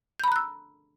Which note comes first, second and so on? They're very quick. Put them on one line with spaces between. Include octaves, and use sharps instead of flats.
G6 B5 A#5 F#6 E6